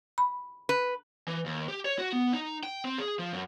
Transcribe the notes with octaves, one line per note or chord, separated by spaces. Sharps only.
B5
B4
E3
D#2
G4
C#5
F#4
B3
D#4
G5
C4
G#4
F3
F#2